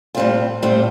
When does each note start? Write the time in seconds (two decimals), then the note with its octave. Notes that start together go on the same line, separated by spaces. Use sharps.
0.15 A2 G3 C4 F4
0.62 A2 G3 C4 F4